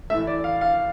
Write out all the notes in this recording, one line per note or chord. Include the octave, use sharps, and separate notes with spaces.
A2 E3 A3 E5
D5
F5
F5